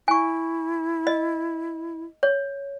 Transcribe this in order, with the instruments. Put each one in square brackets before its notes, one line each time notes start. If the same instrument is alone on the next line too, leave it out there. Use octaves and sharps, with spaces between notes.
[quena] E4 [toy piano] G#5 C#6
[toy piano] D#5
C#5